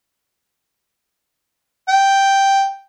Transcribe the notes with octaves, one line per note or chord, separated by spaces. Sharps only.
G5